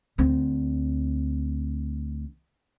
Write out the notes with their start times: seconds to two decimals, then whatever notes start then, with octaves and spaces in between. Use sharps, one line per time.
0.18 D2 C4